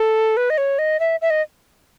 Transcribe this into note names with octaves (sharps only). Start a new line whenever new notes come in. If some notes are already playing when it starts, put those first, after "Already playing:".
Already playing: A4
B4
D#5
C#5
D#5
E5
E5
D#5